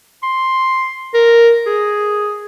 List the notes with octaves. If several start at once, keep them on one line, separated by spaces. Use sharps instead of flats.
C6
A#4
G#4